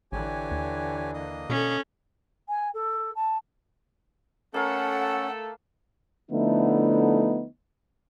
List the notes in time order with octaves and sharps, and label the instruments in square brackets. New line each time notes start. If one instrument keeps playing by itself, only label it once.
[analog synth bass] A1 [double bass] D3 E3 [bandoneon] G4 C#5 G#5
[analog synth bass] D#2
[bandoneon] A#3 D#5 D#6
[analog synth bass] B2 [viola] C#4 A4
[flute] G#5
A4
A5
[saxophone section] A3 A4 [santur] A#3 F5 [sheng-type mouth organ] C#4 [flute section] F#5
[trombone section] D3 F3 A3 B3 D#4 E4